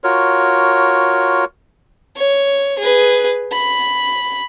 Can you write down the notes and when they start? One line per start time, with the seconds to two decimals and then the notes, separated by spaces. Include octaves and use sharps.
0.04 F4 F#4 A#4 C#5
2.16 C#5
2.78 G#4 B4
3.52 B5